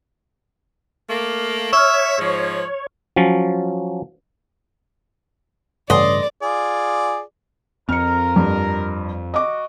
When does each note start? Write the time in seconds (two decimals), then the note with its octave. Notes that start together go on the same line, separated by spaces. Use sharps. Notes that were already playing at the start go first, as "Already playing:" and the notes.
1.09 A3 A#3
1.73 C#5 E5 C#6 F6
2.19 G#2 F3
3.16 F3 F#3 C#4
5.90 A1 G2 C#3 D5 D#5 C6
6.42 F4 G#4 D5
7.89 F2 C4 A#4 F6 C#7
8.36 G2
9.34 F#4 D#5 D6